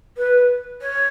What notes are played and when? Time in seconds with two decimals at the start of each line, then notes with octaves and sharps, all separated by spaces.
0.17 B4
0.81 C#5